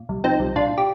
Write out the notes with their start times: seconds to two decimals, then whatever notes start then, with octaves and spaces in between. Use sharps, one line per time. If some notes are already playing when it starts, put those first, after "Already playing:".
Already playing: A#2
0.09 C2
0.24 F3 C4 D#4
0.40 C2
0.56 A#2 D4 F4
0.78 G4